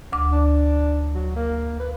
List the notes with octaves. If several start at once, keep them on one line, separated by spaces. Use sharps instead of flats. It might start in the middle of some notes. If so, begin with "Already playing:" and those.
D2 D6
D4
F#3
A#3
B4